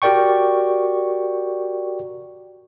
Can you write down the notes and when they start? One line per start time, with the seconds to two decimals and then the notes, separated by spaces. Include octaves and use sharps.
0.02 F#4 G4 A#4 D5 G5 C#6